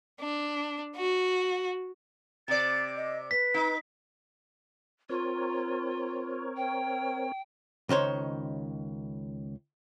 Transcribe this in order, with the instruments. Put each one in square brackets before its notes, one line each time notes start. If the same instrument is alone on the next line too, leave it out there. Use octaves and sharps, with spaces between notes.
[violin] D4
F#4
[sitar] C3 D5 [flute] A6
[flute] D#5
[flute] B4 [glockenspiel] B6
[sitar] D#4
[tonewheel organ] C4 A#4 C#5 [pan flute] F4
[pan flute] G5
[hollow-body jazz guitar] C#2 D#3 C5 C#5